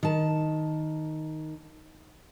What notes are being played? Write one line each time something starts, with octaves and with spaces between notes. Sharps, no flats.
D#3 A5